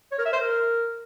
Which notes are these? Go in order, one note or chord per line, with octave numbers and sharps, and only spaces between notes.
C#5
A#4
E5
C5
A#4